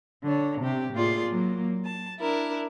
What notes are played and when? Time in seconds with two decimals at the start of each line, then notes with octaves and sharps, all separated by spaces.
0.23 D3 C#5
0.62 C3 G4
0.94 A2 A#3 F4 G#4 D5 C6
1.28 F#3 A#3
1.85 A5
2.20 D4 E4 A#4